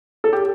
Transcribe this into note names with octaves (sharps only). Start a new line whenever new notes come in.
A4
G4